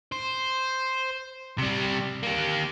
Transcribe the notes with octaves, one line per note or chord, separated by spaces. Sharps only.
C5
C3 G3
A#3 G4